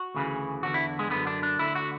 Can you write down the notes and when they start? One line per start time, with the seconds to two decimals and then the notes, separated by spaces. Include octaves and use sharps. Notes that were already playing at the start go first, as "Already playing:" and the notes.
Already playing: F#4
0.14 D2 C#3 E3
0.63 E2 D3 F#4
0.74 E4
0.99 G#3
1.10 F#2 D3 B3
1.27 D4
1.43 D4
1.59 D2 D3 E4
1.75 F#4